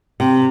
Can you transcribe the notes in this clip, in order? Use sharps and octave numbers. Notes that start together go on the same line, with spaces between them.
C3